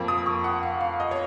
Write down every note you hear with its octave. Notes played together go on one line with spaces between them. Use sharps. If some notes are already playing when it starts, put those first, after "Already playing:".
Already playing: F2 F3 A#3
D#6
C#6
F#5
F5
F5
D#5
C#5